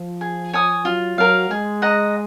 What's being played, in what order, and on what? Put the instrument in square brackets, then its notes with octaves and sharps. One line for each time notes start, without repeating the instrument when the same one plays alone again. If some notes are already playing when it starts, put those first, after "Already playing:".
Already playing: [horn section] F3
[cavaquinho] G#4
C#5 G#5 D#6
[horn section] F#3 [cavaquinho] F4
[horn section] F#3 [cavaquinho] A#4 F5
[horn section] G#3 [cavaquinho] G#4
[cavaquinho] D#5 F#5 A#5